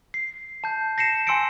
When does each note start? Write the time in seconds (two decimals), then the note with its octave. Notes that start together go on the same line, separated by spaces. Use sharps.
0.14 C7
0.64 A5 G6
0.98 A#6 C7 C#7 E7
1.27 G#5 C6 E6 A#6 C#7 D7